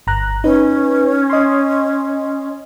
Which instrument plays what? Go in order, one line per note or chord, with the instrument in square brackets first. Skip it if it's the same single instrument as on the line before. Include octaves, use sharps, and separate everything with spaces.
[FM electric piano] G1 A#5 F#6
[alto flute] C#4 [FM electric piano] D#4 B4
[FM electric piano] D#5 C6